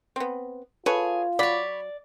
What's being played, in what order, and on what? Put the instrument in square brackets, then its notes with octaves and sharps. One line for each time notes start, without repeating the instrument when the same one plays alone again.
[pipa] B3 C4
[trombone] F4 [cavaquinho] G#4 [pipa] A4 B4 C#5
[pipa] F#3 [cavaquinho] C#5 B5 [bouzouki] D5